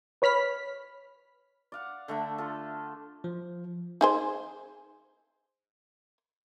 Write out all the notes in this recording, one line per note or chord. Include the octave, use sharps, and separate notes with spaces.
B4 C#5 B5 F6 B6
D5 F5 F#5
D3 A3 E5 F#5
F4 A4
F3
D#4 G#4 C5